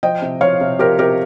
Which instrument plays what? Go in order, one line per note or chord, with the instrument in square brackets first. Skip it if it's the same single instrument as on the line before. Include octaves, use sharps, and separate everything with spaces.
[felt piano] F3 D#5 G5
C3
F3 C#5 F5
C3
F3 G4 A#4
C3 G4 A#4